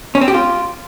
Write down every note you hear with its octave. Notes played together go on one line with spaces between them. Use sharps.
C#4
C4
G4
F4